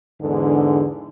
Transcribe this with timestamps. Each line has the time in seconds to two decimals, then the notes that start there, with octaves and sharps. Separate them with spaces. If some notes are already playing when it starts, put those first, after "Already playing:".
0.21 E2 G#2 D3